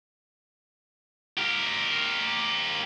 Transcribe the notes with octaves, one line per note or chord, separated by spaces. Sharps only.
G4 A#4